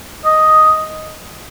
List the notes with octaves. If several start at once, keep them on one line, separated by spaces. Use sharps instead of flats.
D#5